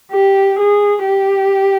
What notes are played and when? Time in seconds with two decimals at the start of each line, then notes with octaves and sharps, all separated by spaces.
0.12 G4
0.59 G#4
1.06 G4